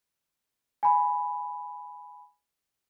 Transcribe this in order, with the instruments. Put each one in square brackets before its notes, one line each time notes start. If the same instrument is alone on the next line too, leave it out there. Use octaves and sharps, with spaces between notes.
[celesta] G#5 B5